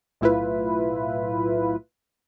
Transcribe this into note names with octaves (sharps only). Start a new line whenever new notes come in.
B1 A2 E4 F4 B4